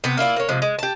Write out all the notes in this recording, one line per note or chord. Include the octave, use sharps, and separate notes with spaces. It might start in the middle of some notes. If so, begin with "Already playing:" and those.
C3 B3 C4
A#3 E4 F4 D5
A#3 C#5
C3 F3 G#3
G#3
G4 A5